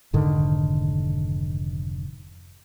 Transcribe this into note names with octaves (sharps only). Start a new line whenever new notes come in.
F1 G#2 D3 D#3